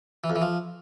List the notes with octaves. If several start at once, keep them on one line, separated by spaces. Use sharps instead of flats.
E3
F2
E3
F3